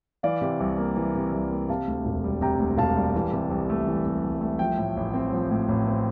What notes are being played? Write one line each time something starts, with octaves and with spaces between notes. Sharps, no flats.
E3 D5 F5
C3
C2
A#3
E3
C3
C2
A#3
C3 F5 A5
D2
E1
G3
C3 G5 A#5
D2
E1 F5 A5
G3
E3
C3
C2
A3
E3
C3
C2
A3
F3 E5 G5
A2
A1
C4
F3
A2
A1
C4